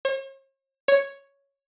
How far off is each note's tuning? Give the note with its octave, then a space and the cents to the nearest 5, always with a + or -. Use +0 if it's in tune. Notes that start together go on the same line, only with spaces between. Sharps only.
C#5 -45
C#5 +0